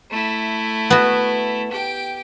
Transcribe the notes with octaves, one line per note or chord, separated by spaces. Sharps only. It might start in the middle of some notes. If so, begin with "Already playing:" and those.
A3 E4
B3 F#4
G4 G5